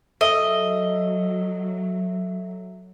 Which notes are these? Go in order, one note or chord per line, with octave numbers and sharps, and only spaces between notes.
F#3 A4 D#5 E5